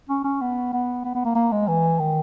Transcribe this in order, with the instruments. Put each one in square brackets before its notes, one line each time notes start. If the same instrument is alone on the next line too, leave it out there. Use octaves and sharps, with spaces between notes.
[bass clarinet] C#4
C#4
B3
B3
B3
B3
A#3
A#3
G#3
E3
D#3